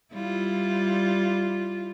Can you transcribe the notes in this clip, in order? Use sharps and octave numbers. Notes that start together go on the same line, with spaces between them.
G3 E4 F4